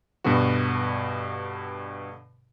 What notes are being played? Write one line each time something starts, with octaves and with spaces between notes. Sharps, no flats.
G2 B2 D3 B3 F#4